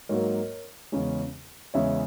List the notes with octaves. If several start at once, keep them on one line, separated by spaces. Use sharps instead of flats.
G#2 F#3 A#3 A#4 C#5
E2 C#3 G#3 C#4
E2 C#3 G#3 C#4 C#5 E5